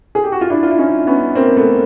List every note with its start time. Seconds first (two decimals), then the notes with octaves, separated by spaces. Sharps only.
0.15 G#4
0.24 G4
0.32 F#4
0.41 F4
0.50 D4 E4
0.63 F4
0.71 E4
0.78 C#4 D#4
1.07 B3 C#4
1.35 A#3 C4
1.57 A3 B3